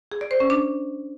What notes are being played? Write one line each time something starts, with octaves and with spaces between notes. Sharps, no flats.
G#4
D5
C5
C#4
D4